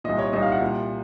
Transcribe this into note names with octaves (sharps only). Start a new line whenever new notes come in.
C2 A#2 D#5
C#5
C2 A#2 D#5
F5
F#5
C2 A#2